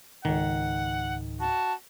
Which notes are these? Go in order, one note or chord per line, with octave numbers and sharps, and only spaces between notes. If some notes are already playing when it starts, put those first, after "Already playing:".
C#2 G#2 D#3 F#5
F#4 A5